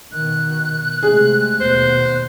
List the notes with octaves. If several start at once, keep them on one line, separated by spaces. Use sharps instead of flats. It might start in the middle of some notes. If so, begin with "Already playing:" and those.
B2 D#3 F#6
C3 G#3 A3 G#4
D#2 B2 C5